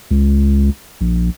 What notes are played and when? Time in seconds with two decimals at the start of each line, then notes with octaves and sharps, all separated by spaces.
0.11 C#2
1.01 A#1